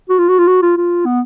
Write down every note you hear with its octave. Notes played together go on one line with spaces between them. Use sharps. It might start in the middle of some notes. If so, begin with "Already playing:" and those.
F#4
F4
F#4
F4
F#4
F4
F4
B3